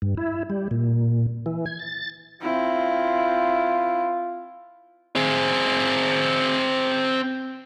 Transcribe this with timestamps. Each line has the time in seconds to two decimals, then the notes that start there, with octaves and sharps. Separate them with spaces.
0.02 G2
0.17 E4
0.50 G3
0.71 A#2
1.46 E3
1.66 G#6
1.79 A6
2.42 C4 E4 F4
5.16 C4 G#4